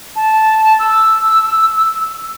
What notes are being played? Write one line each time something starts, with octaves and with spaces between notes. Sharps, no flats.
A5
E6